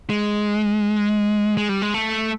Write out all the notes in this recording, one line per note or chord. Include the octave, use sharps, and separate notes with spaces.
G#3
G#3
G3
G#3
A3